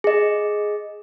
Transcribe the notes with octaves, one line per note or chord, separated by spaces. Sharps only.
G#4 D#5